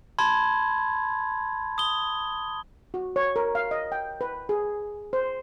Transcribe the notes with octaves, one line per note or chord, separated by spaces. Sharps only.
A5 B5 C6 G#6
D#6 G7
F#4
C#5
A#4
F5
D#5
G5
B4
G#4
C5